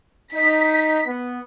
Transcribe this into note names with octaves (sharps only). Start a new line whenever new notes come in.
D#4 B6
B3